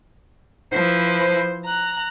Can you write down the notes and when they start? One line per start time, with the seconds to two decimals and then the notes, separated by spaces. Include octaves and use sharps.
0.72 F3 E4 B4 C5
1.66 A#5 F#6